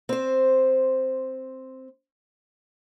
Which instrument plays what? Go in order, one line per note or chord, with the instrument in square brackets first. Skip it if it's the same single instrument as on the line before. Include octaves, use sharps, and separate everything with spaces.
[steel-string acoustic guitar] C4 C5